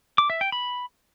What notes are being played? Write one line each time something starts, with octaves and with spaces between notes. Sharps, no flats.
D6
E5
G5
B5